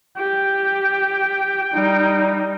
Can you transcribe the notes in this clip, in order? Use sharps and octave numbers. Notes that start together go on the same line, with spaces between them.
G4 G5
G3 D#4